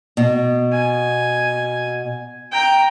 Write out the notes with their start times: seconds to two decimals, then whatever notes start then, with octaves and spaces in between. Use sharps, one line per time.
0.17 B2
0.72 G#5
2.52 G5 A#5